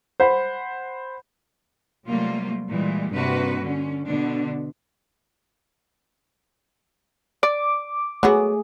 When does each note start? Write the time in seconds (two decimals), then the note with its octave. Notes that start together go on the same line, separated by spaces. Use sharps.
0.20 C5 F#5 B5
2.07 C3 F#3 G3 A3 A#3 F4
2.68 A#2 E3 G3 G#3
3.12 G2 C3 A#3 D4 F#4 B4
3.63 D3 C#4
4.06 B2 D3 B3 D4
7.43 D5 D6
8.23 F#3 A3 B3 F#4 G#4